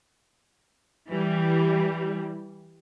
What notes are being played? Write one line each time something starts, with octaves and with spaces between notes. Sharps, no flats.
E3 G3